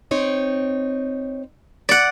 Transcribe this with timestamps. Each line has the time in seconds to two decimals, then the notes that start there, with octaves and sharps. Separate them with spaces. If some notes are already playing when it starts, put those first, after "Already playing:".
0.11 C4 D#4 C#5
1.89 D5 F#5